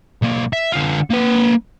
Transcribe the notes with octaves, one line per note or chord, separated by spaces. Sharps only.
B1 A#3
E5
D3 F4
A#3 B4